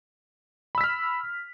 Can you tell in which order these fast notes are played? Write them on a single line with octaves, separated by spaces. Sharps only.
B5 E6 B6 F6